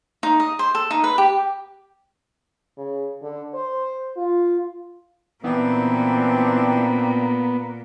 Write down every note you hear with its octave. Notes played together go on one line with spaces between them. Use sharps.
D#4
D#5
C5
A4
D#4
B4
G4
C#3
D3
C5
F4
A#2 E3 B3 C4 D4